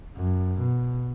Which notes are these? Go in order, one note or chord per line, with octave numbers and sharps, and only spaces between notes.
F#2
B2